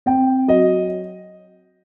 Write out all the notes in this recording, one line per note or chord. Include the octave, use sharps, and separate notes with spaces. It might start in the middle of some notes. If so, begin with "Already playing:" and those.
C4 G5
F#3 D#5